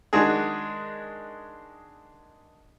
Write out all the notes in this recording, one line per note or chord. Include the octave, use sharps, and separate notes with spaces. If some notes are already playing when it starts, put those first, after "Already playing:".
D#3 G#3 D4 F#4 G#4